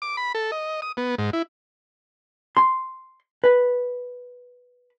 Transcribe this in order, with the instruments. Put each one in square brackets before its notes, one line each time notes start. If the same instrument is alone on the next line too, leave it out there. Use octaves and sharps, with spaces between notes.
[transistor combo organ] D6
B5
A4
D#5
D#6
B3
G#2
E4
[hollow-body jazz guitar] C6
B4